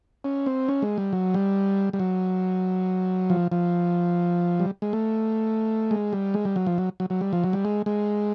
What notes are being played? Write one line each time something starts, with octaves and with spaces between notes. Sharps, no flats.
C#4
C4
C#4
G#3
G3
F#3
G3
G3
F#3
F3
F3
G3
G#3
A3
G#3
G3
G#3
G3
F#3
F3
F#3
F#3
F#3
G3
F3
F#3
G3
G#3
G#3